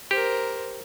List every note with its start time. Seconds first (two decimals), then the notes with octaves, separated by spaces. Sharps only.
0.11 G4 A#4 C5